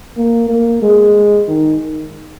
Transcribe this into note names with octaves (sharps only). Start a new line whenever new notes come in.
A#3
A#3
G#3
D#3